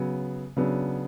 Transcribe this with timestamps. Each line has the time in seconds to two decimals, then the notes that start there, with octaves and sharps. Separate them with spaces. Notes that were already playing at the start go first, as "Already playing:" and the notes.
Already playing: C#3 F#3 B3
0.57 C#3 F#3 B3 D4